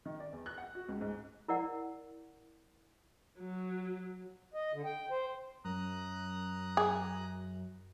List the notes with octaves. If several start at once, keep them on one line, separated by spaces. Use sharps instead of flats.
D#3
D5
E2
F#6
F#5
F#4
C#2
G#2
E4 A#4 D5 F#5
F#3
D#5
D3
G5
C5
F#2 A#5 D#6 F#6
G#4